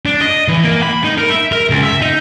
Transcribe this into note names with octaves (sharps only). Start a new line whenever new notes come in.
D4
D#5
E3
A#3
B5
D#4
A#4
E5
A#4
C#2
E5
D#4